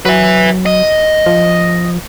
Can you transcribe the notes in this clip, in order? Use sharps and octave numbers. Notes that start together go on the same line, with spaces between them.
F#3 B4 E5
D#5
F3